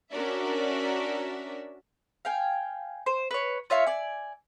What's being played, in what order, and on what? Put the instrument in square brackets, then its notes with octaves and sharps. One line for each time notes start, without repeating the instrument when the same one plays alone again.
[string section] C#4 D4 F#4 A#4 D5 E5
[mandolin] F5 G5 G#5
C5
B4 C#5
F4 C#5 E5 F5
D5 G#5